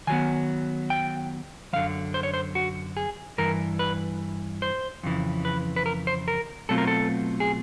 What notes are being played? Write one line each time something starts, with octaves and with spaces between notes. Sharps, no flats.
D#3 F#3 B3 G#5
G5
F#2 D3 F3 F5
C5
C#5
C5
F#4
G#4
G2 E3 A#4
B4
C5
F2 C#3 E3
B4
B4
A#4
C5
A#4
B2 F#3 A3 C4 F4 A4
A#4
A4
G#4